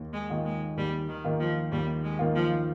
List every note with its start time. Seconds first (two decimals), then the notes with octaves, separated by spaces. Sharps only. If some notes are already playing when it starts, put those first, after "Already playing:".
Already playing: D#2 D#3
0.13 G#3
0.30 D#3 A#3 F4
0.45 G#3
0.77 D#2 G3
1.08 D#3
1.24 D#3 A#3 F4
1.40 F3
1.72 D#2 G3
2.04 G#3
2.19 D#3 A#3 F4
2.35 F3